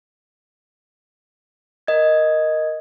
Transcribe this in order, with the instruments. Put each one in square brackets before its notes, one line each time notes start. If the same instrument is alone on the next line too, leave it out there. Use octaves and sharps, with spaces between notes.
[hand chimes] A#4 D#5 G#6